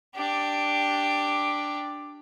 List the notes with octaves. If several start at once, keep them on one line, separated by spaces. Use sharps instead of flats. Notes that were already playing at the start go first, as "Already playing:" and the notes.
D4 G4